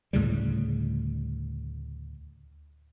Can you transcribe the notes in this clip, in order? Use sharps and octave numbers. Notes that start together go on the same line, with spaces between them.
D2 A2 C#3 G3